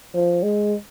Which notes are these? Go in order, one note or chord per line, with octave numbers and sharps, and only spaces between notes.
F3
G#3